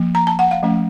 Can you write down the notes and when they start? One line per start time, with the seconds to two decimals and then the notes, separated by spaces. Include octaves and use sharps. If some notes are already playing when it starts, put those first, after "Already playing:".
Already playing: F3 A#3
0.15 A#5
0.27 A5
0.39 F#5
0.51 F5
0.63 F3 A3 C#4